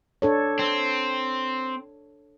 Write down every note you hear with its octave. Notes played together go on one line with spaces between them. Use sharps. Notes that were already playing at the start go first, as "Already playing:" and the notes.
D4 A4 C#5
C4